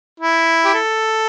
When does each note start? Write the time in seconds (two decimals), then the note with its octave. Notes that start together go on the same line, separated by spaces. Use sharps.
0.20 E4
0.65 G4
0.74 A4